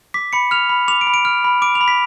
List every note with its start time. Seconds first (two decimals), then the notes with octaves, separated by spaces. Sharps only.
0.14 D6 B6
0.33 B5 C#7
0.51 F6 F7
0.69 B5
0.88 D6 F7
1.01 D7
1.07 B5
1.14 D7
1.25 F6 D7
1.44 B5
1.62 D6 D7
1.75 F7
1.81 B5
1.88 B6